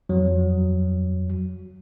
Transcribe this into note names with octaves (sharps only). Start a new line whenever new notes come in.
F2 F#3